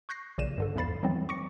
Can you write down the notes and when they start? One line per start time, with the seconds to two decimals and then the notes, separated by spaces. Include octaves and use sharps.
0.09 C#6 F#6 G6 A#6 C7
0.38 A#1 C#3 D5 D#7 E7
0.58 G2 D3 A4
0.76 E2 G#2 F3 B5 A6 C7
1.03 D#3 E3 F#3 G3 B3 C4
1.29 C#6 D6 A#6 C#7